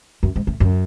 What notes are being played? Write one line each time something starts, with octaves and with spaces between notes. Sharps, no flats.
F#2
G#2
A2
F#2